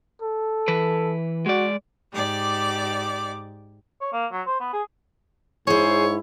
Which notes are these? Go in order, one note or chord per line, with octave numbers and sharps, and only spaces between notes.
A4
E3 B4
G#3 F#4 D5
G#2 G4 D5 D6
C#5
A#3
F#3
C5
B3
G#4
G#2 E4 G#4 C5 C#5